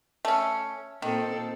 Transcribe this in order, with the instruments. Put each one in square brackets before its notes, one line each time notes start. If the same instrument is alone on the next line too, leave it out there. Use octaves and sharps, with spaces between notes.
[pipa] A3 C#4
[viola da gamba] A#2 C4 A4 [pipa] D#3